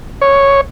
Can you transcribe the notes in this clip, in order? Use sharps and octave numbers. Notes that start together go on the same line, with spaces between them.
C#5